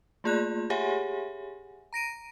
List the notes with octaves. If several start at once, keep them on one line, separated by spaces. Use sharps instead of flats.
A3 A#3 F4 G#4 D5 F#6
G4 G#4 C#5 E5 F#5 G#5
A#5 A#6 D7 D#7